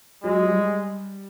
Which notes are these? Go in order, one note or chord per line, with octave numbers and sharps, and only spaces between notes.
F#3 G#3
G3